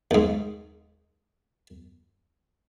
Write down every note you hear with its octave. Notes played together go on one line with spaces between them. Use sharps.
D#2 G#2